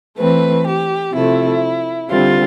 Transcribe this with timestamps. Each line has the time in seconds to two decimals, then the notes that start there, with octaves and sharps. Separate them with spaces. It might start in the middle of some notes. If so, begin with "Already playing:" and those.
0.18 E3 A3 C4 B4
0.65 G4
1.13 C3 F3 A3 E4
2.10 D3 G3 C4 F4